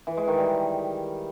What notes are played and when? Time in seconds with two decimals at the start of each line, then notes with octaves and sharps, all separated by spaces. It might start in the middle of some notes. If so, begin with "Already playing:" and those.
0.07 E3
0.17 G#3
0.28 D#3
0.38 G3